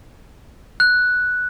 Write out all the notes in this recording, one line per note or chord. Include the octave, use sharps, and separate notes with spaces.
F#6